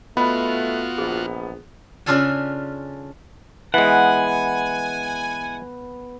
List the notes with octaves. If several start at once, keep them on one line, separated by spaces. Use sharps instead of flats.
A3 B3 F4 F#4 D#5 B5
A#1 G#4
C#3 C#4 D4 F4 A4 G#5
E3 G#3 B3 F#5 G#5